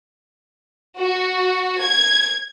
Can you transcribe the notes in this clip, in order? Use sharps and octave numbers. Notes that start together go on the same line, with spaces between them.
F#4
G#6